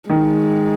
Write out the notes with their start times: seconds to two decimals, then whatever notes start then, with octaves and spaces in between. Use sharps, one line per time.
0.09 D#3 G#3